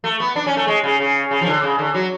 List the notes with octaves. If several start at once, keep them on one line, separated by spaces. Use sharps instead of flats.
A3
B3
D4
C#4
A3
G#3
C#3
C#3
C#3
F3
D3
C#3
D3
F#3